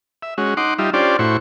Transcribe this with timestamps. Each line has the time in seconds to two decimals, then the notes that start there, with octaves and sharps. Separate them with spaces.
0.22 E5
0.38 G#3 C#4 F#4
0.57 D#4 F#5 C6 D6
0.78 G3 D#4 F4 E5
0.94 C#4 D4 F4 G4 C5 D5
1.19 A2 E4 F#4 C5 C#6